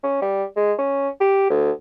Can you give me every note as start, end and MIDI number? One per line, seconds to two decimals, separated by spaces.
0.03 0.20 61
0.22 0.44 55
0.56 0.73 56
0.78 1.09 61
1.20 1.50 67
1.50 1.71 38